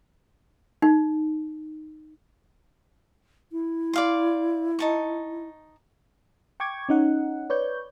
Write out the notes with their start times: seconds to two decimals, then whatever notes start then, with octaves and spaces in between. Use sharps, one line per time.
0.82 D#4
3.52 E4
3.93 D5 F5 C6
4.79 D#4 A5 C#6
6.60 G5 C#6 D6 G#6
6.89 C#4 D#4 F#5
7.50 B4 C#5 D5 G6